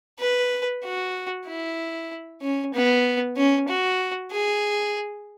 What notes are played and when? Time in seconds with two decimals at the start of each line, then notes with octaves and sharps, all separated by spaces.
0.20 B4
0.84 F#4
1.47 E4
2.42 C#4
2.74 B3
3.36 C#4
3.68 F#4
4.31 G#4